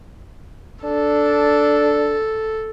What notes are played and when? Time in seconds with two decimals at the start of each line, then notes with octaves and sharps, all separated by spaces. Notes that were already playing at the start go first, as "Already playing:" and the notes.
0.84 D4 A4